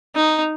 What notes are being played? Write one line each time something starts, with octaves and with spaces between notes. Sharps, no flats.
D#4